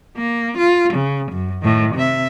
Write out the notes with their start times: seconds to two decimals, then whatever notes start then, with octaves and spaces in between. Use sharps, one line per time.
0.17 A#3
0.58 F4
0.94 C#3
1.32 F#2
1.62 A2 D#3
1.95 C3 E5